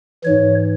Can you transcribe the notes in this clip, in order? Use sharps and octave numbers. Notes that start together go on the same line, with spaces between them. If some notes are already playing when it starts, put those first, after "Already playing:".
G#2 E3 C#5